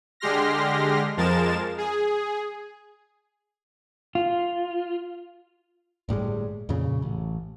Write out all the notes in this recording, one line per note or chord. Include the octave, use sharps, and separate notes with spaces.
D3 G#3 G4 C6 F6 A#6
F2 F3 G#3 A#4 A6 E7
G#4
F4
G1 A2 G3 G#3
F2 A#2 C#3
A1